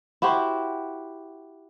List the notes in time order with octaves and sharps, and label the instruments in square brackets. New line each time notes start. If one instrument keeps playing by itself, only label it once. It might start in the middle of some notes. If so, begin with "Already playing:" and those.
[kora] E4 F#4 G4 C5